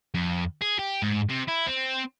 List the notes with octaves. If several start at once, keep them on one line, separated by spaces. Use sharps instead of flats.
F2
G#4
G4
G#2
C3
E4
C4